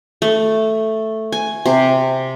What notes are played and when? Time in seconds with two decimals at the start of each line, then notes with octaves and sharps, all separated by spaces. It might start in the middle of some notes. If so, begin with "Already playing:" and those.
0.22 A3
1.32 G#5
1.66 C3